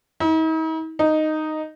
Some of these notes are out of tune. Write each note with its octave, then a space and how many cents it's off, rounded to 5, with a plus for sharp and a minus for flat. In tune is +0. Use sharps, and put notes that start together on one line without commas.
D#4 +45
D#4 -5